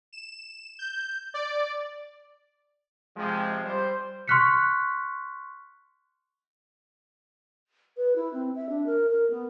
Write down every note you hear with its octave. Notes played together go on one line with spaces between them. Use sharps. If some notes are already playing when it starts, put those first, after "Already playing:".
E7
G6
D5
C3 F3 G#3
G3 C5
C6 C#6 F6 F#6 B6 C#7
B4
E4
C4
E5
D4
A#4
A#4
B3